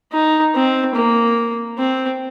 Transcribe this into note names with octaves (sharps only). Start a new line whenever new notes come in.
D#4
C4
A#3
C4